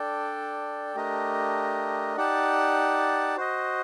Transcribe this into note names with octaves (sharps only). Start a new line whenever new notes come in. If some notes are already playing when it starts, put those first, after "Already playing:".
Already playing: D4 A4 D5 G5
A3 D4 G4 A#4 D#5
D#4 G4 D5 F#5 A5
F#4 C5 D#5